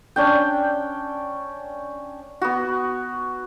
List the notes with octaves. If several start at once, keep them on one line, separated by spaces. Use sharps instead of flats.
C#4 D4 G5
B3 F#4